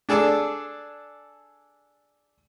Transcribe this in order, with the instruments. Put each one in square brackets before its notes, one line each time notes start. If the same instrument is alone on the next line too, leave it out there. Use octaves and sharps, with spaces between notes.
[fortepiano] D4 G#4 A4 D5